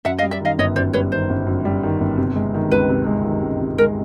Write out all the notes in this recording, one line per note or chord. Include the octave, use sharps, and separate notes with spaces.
F#2 E5 F#5
D#5 F5
G3
D5 E5
D#3 D#5 F5
G1 C#5 D#5
F#2 C5 D5
G3 B4 C#5
D#3 C5
G1
F#2
G3
D#3
G1
C3
G#3
D#3
C#2 B4
C3
G#3
D#3
C#2
C3
G#3 A#4